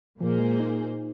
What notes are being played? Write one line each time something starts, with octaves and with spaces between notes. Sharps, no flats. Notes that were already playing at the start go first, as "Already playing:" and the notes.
A#2 F3 A#3 G#4 C5
G#3
D#4